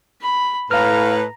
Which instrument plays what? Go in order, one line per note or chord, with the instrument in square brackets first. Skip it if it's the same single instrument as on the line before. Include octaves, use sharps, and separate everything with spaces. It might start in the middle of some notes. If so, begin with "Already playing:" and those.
[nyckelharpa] B5
[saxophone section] A2 B4 [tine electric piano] F5 F6 [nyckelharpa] A#5